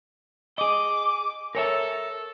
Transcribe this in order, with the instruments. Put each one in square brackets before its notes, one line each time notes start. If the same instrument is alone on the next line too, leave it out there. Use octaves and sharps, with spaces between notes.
[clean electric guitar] G#4 D#5 [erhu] D6
[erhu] A4 [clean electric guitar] A#4 C#5 E5